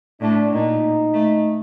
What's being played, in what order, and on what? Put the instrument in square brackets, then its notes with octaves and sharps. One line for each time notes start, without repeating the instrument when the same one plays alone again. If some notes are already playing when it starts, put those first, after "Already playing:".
[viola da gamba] A2 [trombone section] D4
[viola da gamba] A#2 [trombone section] D#4
[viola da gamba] A3